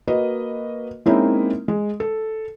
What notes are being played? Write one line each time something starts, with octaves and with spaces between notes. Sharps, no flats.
A#3 F#4 B4 D#5
G#3 A#3 C4 C#4 D#4 E4
G#3
A4